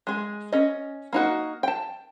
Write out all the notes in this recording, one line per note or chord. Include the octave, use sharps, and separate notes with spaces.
G#3 G#4
C#4 D#5
A#3 D#4 F#4
G5 A5